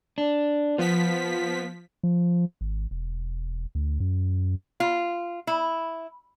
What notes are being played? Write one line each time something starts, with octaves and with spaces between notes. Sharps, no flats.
D4
F3 B3 B6
F3
G#1
E1
D2
F#2
F4
E4